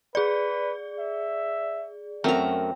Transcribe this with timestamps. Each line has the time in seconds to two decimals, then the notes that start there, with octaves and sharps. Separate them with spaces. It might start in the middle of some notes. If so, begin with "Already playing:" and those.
0.15 G#4 B4 D5
0.99 E5
2.24 F#2 A3 C4 F#4 A#4 A#5